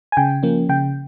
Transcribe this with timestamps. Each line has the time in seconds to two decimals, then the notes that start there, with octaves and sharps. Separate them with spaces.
0.12 G#5
0.17 C#3 G5
0.43 F3 A#3 C#4
0.69 C#3 G5